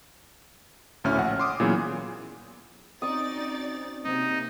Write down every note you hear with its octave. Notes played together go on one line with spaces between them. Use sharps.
G#1 D2 A2 C#4 E5 F6
A#1 F#5
C6 D6 D#6
A#2 E3 F#3 B3 C#4 G#4
C4 C#4 D#4 F#4 D5 C#6 D#6 A6
C3 A#3 D#4